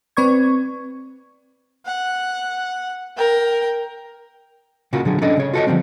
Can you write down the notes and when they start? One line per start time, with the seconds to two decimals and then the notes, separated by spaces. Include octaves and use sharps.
0.17 C4 B4 D5 C#6 G#6
1.86 F#5
3.17 A#4 G5
4.93 A#2 C#3 A#3 F4 F#4
5.05 D3 F#3 G#4
5.21 C#4 D4 A4 D5 D#5
5.37 C#3 C#5
5.54 F4 F#4 A4 C5 C#5 D#5
5.67 D3 E3 F3 G3 C4